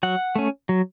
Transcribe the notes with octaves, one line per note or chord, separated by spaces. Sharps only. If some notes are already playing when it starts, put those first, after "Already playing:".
F#3 F#5
A3 C#4
F#3